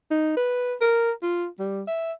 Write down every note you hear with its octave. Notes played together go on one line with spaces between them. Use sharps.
D#4
B4
A#4
F4
G3
E5